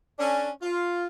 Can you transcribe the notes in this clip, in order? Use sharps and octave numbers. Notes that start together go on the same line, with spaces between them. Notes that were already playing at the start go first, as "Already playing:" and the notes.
C#4 D4 A4
F4